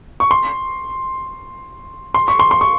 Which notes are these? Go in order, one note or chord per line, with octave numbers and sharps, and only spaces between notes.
C#6
C6
C6
C#6
C6
C6
C#6